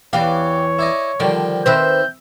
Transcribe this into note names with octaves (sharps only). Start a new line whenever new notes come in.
E2 E3 G4 C#5 D5 F5
E4 D5 D#5
D3 D#3 F3 G3 D5
D#3 C4 B4 C5 E5 G6